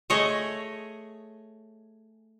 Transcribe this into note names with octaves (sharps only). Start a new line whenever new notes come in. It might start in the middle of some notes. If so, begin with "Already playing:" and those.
A3 G#4 C#5 D#5